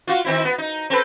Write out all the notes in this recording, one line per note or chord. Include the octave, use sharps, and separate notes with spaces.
F4 F#4
D#3 C4 E4
B3
D#4
C4 A4 B4